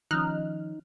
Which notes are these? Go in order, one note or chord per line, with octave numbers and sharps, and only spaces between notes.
D#3 F3 C#4 D#4 F6 F#6